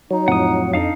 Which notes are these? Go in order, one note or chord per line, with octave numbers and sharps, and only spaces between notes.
F#3 D#4
F2 A2 F3 F#5 D#6
F2 D4 D#4 F5